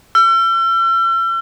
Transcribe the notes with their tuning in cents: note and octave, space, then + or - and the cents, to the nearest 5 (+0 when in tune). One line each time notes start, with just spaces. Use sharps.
E6 +45